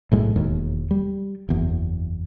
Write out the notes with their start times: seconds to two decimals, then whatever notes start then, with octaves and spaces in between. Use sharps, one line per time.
0.12 B1 A2 G#3
0.36 E1 D#2
0.91 G3
1.49 F#1 E2